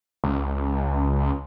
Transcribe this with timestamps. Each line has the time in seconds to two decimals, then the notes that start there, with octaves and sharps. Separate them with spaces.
0.24 C#2